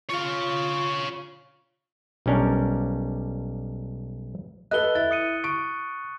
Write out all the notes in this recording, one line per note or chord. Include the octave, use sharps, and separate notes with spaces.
F4 C#5 F5
B1 G3 C#4 D4 A#4
A4 B4 D#5 F#6 G7
E4 A6
D#6 C#7 D#7
C#6 D7